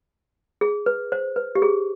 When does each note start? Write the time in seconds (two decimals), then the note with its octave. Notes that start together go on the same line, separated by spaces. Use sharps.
0.61 G#4
0.86 B4
1.12 C5
1.36 B4
1.55 G4
1.62 G#4